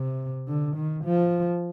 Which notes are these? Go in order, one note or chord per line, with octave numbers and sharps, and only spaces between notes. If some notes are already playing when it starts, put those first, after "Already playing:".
Already playing: C3
D3
D#3
F3